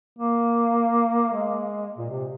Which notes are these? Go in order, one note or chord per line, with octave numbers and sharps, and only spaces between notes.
A#3
G#3
A#2
C3